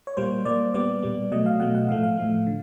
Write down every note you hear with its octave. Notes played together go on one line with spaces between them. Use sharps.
C#5
A#2 G3 A#3 C5
A#2 G3 A#3 D5
A#2 G3 B3 D5
A#2 G3 B3
B2 F#3 A3 D#5
F5
B2 F#3 A3 F#5
F#5
A2 F3 A3 F5
F5
A2 F3 A3
D3